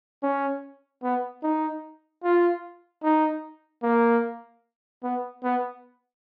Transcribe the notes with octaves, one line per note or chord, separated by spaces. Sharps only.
C#4
B3
D#4
F4
D#4
A#3
B3
B3